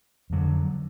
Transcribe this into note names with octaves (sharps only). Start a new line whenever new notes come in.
F2 D3 F#3